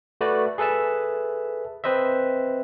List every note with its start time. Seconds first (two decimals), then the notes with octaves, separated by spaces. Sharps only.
0.21 A3 F#4 B4 D5
0.58 G#4 A4 B4 E5 A5
1.84 C4 B4 C5 D#5 E5